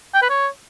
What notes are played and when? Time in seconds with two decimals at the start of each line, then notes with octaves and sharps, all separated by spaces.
0.14 G5
0.22 B4
0.30 C#5